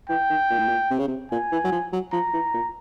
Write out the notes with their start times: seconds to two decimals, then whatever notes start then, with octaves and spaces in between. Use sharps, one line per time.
0.09 E3 G5
0.30 D#3
0.50 A#2
0.59 A2
0.68 A#2
0.91 C3
0.99 C#3
1.07 C3
1.31 A#2 G#5
1.52 E3
1.64 F#3
1.72 F3
1.93 F#3
2.12 F3 A#5
2.33 E3
2.54 A#2